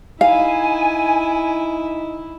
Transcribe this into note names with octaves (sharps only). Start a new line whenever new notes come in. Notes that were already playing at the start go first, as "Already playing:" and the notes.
D#4 E4 F5 G#5